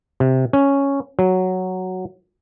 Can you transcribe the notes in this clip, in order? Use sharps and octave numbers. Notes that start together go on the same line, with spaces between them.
C3
C#4
F#3